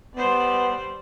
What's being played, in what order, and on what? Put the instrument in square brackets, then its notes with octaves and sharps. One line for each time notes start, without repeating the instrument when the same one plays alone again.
[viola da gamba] G3 C5 D5 [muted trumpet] B3